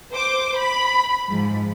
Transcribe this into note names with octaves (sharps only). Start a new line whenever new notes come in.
C5 D6
B5
G#2 F3